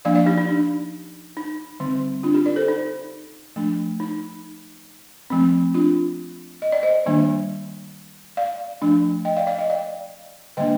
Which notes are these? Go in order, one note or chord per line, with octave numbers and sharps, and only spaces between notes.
F3 A#3 D4 D5 F5
D5 F5
D#4 G4
D#4
D4
D#4
D3 G3 C4
D4 F4
D#4 G4
A#4 D5
A4 C5
D#4
F3 A3 D4
D#4
F3 A3 C4
D4 F4
D#5
D5
C5 D#5
D#3 G3 A#3 D4
D5 F5
F3 A3 D4
D#5 G5
D5 F5
D5 F5
D#5 G5
D5 F5
D3 G3 A#3 D4 D#5 G5